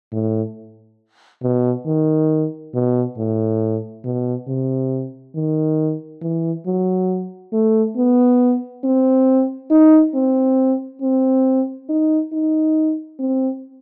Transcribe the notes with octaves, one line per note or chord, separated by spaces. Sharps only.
A2
B2
D#3
B2
A2
B2
C3
D#3
E3
F#3
A3
B3
C4
D#4
C4
C4
D#4
D#4
C4